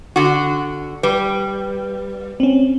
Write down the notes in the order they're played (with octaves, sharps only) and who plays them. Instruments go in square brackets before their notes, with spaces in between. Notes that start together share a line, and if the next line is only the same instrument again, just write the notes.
[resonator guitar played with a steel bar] D3 F#4
[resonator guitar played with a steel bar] G3 [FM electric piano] B4
[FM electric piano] C4 C#4